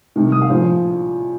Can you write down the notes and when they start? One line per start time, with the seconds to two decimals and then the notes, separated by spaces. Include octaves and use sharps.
0.16 C2 C3 D#3
0.32 D#6
0.41 F5
0.50 A#1 A2 F3 C5